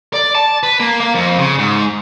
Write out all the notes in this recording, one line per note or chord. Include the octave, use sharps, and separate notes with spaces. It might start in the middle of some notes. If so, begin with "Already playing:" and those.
D5
A5
B4
A#3
A#3
F2
C#3
G#2